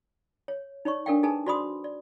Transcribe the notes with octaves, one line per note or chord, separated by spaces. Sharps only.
C#5
D#4 C#5 D5 C#6
D4 A4 A#4 D5 F5 G5
D#4 G#4 A4 B4 G#5 A5
F#4 C5 D5 B5 C6 D#6
D5